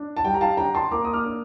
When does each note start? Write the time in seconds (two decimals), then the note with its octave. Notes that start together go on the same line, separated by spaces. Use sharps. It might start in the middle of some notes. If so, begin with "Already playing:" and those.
Already playing: D4
0.17 A5
0.24 G3 G5
0.34 A#5
0.41 F5 A5
0.57 D4 G5 A#5
0.75 A5 C6
0.91 A#3 A#5 D6
1.05 D#6
1.13 D6 F6
1.25 D4